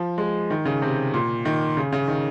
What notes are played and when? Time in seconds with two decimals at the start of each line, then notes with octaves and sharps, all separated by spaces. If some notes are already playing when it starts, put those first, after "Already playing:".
Already playing: F3
0.18 G#3
0.50 D#3
0.65 C#3
0.82 C3
1.14 A#2
1.45 D#3
1.77 C#3
1.92 C#3
2.08 D#3